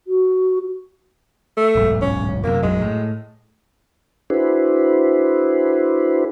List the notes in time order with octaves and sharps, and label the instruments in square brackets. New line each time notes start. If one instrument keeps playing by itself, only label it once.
[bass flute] F#4
[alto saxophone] A3
[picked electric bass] D1 B1 G#2
[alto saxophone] C#4
[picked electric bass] F#2 C3 [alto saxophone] A#3
[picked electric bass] A#1 F#2 F#3 [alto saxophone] G#3
[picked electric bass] A2
[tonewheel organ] D4 E4 F#4 G#4 B4 C5